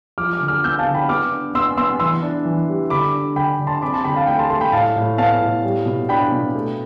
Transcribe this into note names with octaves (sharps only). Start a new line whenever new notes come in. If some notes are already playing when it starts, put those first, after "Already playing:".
F3 D6 F6
D6 F6
D3
D6 F6
B3 E6 G6
F5 A5
D3
G5 B5
B3 D6 F6
D4
B3 C6 E6
B3 C6 E6
E3 C6 E6
D4
E3
G3
D3 B5 D6
D4
D3 G5 B5
D3
A5 C6
C4 B5 D6
A5 C6
D3 G5 B5
F5 A5
A3 G5 B5
A5 C6
A3 A5 C6
G5 B5
A2 F5 A5
A2
B3 F5 A5
A2
G3
B2
D4 G5 B5
B2
A3